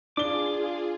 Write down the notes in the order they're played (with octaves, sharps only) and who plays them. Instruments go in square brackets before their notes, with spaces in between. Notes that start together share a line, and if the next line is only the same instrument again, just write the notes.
[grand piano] D4 G7 [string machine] F4 G#4 [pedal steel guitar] D6